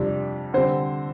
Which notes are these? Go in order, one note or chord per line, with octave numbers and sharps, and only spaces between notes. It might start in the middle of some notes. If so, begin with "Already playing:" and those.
Already playing: F2 C3 G3 D4
D3 G3 C4 C5